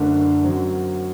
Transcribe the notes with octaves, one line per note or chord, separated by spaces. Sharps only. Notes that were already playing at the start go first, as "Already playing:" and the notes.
Already playing: F#1 F#2 D3 A3 D4
F#2 F#3 C4